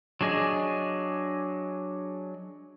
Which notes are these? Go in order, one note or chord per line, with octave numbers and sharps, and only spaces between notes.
F#3 D4 G#4 D#5